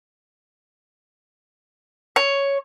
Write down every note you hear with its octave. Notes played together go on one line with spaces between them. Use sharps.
C#5